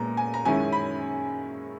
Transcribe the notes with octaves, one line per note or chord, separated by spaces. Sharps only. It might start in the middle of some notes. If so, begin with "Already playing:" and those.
Already playing: A#2 G#3 B3 A#5
G#5
A#5
F#2 D#3 G#3 C#4 E4 G#5
B5